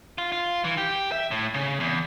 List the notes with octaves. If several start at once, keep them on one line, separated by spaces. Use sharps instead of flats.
F4
F4
E3
G4
E5
A2
C#3
E2